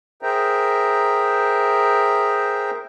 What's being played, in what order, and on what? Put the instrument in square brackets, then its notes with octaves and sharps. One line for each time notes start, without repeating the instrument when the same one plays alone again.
[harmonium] G#4 A#4 C5 E5 G5 A#5